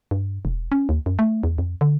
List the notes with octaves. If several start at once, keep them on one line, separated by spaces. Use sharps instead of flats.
G2
E1
C#4
D#2
F#2
A3
E2
F2
D3